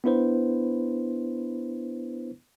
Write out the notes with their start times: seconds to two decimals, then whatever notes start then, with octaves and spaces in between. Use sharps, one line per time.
0.04 B3 D4 E4 B4 C5